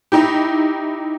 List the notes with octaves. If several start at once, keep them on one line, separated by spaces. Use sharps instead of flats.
D#4 E4 G4